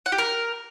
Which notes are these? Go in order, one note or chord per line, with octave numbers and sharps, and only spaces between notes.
F#5
G4
A#4